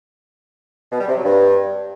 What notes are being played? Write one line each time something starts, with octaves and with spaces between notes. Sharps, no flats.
B2
G3
C3
F#3
G2